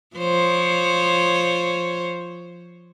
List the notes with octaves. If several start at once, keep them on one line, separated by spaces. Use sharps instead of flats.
F3 C5 C#5